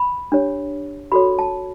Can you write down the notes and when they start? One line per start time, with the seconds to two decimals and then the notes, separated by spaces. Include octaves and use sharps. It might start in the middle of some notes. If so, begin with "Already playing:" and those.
Already playing: B5
0.32 D4 G4 C#5
1.12 F#4 A4 C#5 B5
1.39 A5